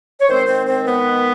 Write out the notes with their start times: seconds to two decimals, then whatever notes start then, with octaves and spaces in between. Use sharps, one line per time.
0.21 C#5
0.29 D#3 G#3 C4 C5
0.48 C4 C5
0.68 C4 C5
0.87 B3 B4